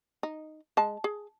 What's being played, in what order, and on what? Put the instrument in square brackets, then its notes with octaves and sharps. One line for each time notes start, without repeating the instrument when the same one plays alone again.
[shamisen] D#4
G#3 A5
G#4